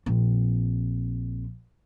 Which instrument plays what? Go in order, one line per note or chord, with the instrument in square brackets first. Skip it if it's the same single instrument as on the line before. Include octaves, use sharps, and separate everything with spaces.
[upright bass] A#1 C4